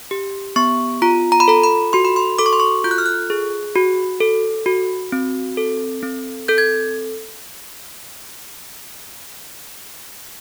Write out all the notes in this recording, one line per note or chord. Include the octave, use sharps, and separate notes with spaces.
G4
B3 C#6
F4 A#5
A#5
B5
A4 A#5
B5
F#4 C6
B5
C6
A4 D6
C#6
C6
C#6
F4 G6
F#6
F6
F#6
G#4
F#4
A4
F#4
C4
A4
C4
A4 G6
G#6